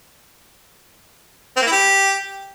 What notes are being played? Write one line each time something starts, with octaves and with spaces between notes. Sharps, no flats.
C4
A#3
E4
G4